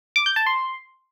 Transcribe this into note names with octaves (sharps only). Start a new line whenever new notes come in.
D6
G6
A5
C6